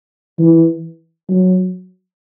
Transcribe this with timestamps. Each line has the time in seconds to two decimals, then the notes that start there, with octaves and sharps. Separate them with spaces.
0.39 E3
1.29 F#3